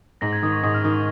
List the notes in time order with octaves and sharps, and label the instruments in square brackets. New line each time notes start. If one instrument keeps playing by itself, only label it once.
[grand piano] G#2 [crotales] A#6
[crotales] G#6
[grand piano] D#3 [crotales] D#6
[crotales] C#6
[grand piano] G#2 [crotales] D#6
[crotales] F6
[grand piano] D#3 [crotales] D#6
[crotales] C#6